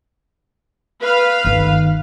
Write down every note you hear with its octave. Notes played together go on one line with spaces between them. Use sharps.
B4 F5
G1 D#3